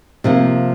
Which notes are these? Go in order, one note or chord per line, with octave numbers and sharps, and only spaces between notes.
C3 F3 A#3